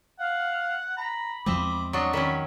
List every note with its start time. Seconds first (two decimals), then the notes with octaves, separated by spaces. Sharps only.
0.19 F5 F#5
0.97 A#5 B5
1.46 E2 F3 G#3 C4 D#5 E5 D6
1.93 F#3 D4 D#5 C#6
2.13 D#3 F#3 C#4 B5